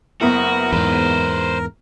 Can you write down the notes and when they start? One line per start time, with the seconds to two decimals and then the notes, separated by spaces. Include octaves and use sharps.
0.21 F#1 B3 E4 F#4 A#4
0.72 E2 G#2 B4 C5